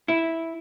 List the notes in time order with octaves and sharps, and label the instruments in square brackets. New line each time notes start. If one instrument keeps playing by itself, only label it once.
[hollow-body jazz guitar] E4